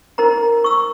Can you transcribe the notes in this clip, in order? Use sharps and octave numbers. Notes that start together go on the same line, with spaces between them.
D#4 A#4 C5 A#5
C#6 E6